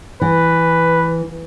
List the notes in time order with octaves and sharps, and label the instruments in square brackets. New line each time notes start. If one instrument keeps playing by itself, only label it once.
[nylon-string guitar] E3 [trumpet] B4